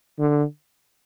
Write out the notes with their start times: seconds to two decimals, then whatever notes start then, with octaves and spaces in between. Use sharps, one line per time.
0.19 D3